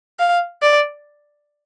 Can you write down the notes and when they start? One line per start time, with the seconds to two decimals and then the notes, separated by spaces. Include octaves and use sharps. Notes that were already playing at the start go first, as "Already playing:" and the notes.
0.19 F5
0.62 D5